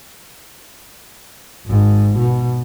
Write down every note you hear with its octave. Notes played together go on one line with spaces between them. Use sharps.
G#1 G#2
B2